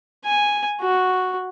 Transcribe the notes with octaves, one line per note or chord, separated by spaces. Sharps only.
G#5
F#4